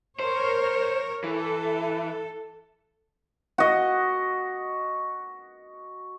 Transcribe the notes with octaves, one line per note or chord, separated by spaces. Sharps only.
A#4 C5 C#5
E3 A4
F#4 D#5